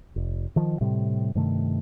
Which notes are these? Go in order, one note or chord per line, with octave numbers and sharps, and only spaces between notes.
F1
D#3 F3
A2 C3 G3
G2 C3 D#3 A3